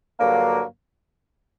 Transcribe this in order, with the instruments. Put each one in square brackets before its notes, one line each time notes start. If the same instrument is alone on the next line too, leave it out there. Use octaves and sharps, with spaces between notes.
[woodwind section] G2 D3 F#3 A#3